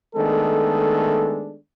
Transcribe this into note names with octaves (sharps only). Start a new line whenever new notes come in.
D#3 G#3 A3 B3 D4 A4